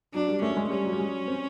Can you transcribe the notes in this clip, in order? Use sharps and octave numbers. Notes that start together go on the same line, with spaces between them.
F#3 D4
G3
A3 C#4
G#3
G3 C#4
F#3
G3
G#3
C4